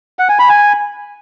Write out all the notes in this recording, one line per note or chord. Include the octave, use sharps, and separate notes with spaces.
F#5
G#5
B5
G#5